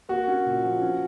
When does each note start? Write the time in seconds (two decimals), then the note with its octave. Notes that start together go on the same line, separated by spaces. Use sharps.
0.09 A#3 F#4
0.28 C#4
0.46 A#2
0.63 F3
0.82 C#4